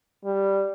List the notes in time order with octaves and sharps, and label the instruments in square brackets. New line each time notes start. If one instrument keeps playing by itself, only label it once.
[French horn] G3